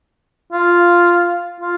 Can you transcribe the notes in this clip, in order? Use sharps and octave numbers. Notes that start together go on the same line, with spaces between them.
F4
F4